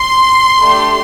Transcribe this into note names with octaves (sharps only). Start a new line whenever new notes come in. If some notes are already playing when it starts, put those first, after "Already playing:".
Already playing: C6
A3 D4 G4